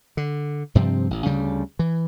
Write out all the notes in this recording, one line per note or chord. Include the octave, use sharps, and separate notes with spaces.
D3
G2 C3 F3 C4
A1
D2 C#3 G3
E3